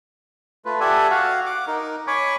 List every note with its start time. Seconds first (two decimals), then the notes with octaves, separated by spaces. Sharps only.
0.65 A3 F4 B4
0.80 G4 A4 D5 E5 F#5 G#5
1.11 F#4 F5 F#5
1.46 F#5 D6
1.67 D#4 A#4
2.07 C#5 G#5 B5 C#6 D6